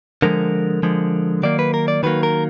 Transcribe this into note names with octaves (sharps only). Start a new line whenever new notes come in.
D3 F3 G#3 A#4
D3 F3 G#3
D#3 F#3 A#3 D5
B4
A#4
D5
D#3 F#3 A#3 B4
A#4